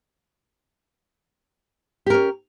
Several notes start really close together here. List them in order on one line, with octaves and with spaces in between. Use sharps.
G4 A#4 C#4